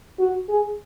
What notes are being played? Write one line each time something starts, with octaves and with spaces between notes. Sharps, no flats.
F#4
G#4